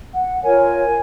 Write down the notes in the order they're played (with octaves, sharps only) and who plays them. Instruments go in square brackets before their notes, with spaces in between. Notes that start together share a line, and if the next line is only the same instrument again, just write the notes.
[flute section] F#5
F4 A#4 C#5 G#5